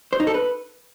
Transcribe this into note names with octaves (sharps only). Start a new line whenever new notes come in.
C5
D#4
A4
B4